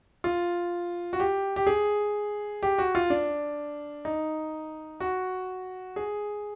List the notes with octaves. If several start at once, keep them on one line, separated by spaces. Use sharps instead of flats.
F4
F#4
G4
G4
G#4
G4
F#4
F4
D4
D#4
F#4
G#4